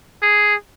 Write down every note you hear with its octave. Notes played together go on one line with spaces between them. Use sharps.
G#4